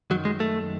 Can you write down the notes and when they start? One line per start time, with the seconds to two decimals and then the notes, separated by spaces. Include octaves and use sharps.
0.10 F#2 D#3 F#3
0.25 G#3
0.40 A3